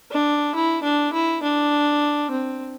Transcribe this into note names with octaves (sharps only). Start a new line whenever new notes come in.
D4
E4
D4
E4
D4
C4